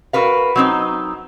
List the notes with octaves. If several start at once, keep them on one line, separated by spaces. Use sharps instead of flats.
F#4 A#4 B4 F5
F#3 C4 D#4